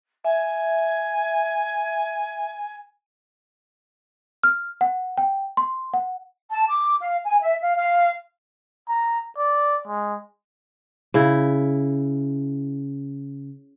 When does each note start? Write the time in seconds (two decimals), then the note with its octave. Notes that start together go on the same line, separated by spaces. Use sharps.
0.25 E5 G#5
4.43 F6
4.81 F#5
5.18 G5
5.57 C6
5.94 F#5
6.51 A5
6.69 D6
7.00 F5
7.25 G#5
7.41 E5
7.62 F5
7.76 F5
8.88 A#5
9.38 D5
9.87 G#3
11.14 C#3 E4